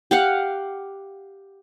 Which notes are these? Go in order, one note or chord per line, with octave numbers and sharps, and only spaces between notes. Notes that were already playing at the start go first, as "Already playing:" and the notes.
G4 F5 F#5